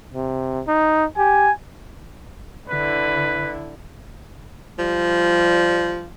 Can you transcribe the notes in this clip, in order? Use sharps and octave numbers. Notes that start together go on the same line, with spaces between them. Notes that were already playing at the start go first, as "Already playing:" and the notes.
C3
D#4
G4 G#5
D3 E4 B4
F3 G3